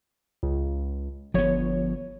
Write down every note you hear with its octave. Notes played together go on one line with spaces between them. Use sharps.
C#2
G1 F3 B3 C#5